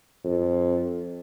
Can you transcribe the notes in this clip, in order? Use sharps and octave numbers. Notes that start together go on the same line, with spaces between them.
F2